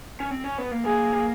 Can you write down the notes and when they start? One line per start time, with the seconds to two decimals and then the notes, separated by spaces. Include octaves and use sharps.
0.20 C#4
0.31 C4
0.44 C#4
0.58 B3
0.71 A#3
0.85 A#3 G#4
1.12 A#3